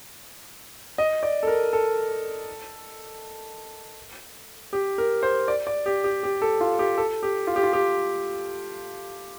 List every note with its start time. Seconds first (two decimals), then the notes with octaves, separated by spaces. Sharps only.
0.98 D#5
1.23 D5
1.43 A4
1.47 A#4
1.73 A4
4.73 G4
4.98 A#4
5.23 C5
5.48 D5
5.67 D5
5.86 G4
6.04 G4
6.23 G4
6.42 A4
6.61 F4
6.79 G4
6.98 A4
7.23 G4
7.47 F4
7.56 G4
7.63 F4
7.73 G4